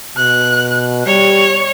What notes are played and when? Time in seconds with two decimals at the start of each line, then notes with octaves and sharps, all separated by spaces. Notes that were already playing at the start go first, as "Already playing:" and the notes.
0.18 B2 F#6
1.06 G3 C#5